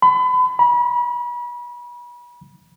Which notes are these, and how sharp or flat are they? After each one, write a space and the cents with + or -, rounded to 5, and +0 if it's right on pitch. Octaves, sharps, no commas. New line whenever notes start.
B5 +35
B5 -35